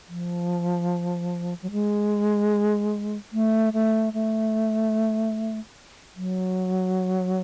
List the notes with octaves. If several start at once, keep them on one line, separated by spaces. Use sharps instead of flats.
F3
F#3
G#3
A3
A3
A3
F#3